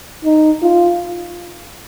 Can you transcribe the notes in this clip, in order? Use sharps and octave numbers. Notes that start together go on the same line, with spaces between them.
D#4
F4